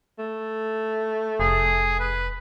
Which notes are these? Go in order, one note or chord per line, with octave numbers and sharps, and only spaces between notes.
A3
F1 G#4
B4